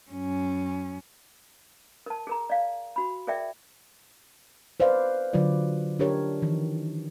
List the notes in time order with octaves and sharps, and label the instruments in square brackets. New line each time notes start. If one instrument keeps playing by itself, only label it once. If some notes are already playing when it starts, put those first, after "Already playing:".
[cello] F#2 C#4
[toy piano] A#4 A5
G#4 A#4 A#5
D5 F5
F#4 B5
G#4 A#4 D5 E5 G5
[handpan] B4 C5 D5 F5
D3 F#3 F4 B4 D5
D4 G4 A#4 C#5
D#3 E3